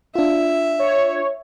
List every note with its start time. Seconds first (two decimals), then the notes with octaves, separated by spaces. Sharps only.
0.15 D4 F4 E5
0.79 C#5